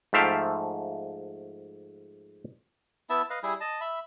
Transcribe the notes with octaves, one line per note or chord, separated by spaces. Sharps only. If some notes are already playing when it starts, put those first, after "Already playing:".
G#2 F3 A3 E5 F5 G5
B3 E4 E5 A5
B4 D#5 F5
G3 E4 G#4
D#5 A5
E5 B5